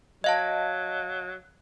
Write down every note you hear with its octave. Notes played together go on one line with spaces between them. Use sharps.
F#3 D#5 F5 A5